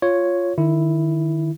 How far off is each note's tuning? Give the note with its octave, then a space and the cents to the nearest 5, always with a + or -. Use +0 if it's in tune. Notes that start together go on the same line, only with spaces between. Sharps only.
F4 +0 C#5 +0
D#3 -25 E4 +0